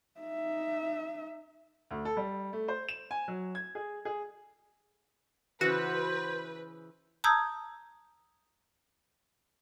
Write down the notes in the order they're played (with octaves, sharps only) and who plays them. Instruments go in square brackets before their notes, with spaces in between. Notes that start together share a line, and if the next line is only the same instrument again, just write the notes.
[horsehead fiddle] D#4 E5
[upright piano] D2
A4
G3
A3
C5
E7
G#5
F#3
G#6
G#4
G#4
[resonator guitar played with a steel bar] C#3 E3 [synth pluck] F#4 [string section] B4 [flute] C5
[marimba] A5 A#5 D#6 E6 G6 G#6